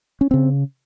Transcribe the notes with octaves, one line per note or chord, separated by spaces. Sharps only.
C#4
C#3 C4